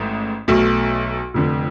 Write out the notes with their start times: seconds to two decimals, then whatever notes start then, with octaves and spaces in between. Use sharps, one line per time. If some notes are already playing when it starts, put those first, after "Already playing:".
Already playing: A1 G#2 A3
0.48 B1 B2 A3
1.34 F1 F2 D3